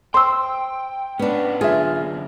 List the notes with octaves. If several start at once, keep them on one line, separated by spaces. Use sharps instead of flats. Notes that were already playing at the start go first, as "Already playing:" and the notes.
C5 G5 C6 E6
B3 C#4 D4 B4
F#2 D3 F4 G#4 E5